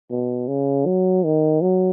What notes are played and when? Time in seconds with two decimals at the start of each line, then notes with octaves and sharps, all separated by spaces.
0.11 B2
0.48 C#3
0.86 F#3
1.25 D#3
1.61 F#3